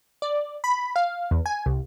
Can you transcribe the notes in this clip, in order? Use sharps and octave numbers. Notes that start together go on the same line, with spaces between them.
D5
B5
F5
E2
G#5
C2